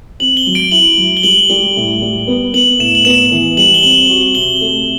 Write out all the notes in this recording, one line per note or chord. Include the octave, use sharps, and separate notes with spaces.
C4 F#7
G7
F#3
D7
E4 F#7
F#3
G7
G3 F#7
G3
A2
G3
B3
B3 F#7
A2 E7
F#7
B3 E7
E3
G3 F#7
G7
C4 F#7
F#4
C3 G7
A3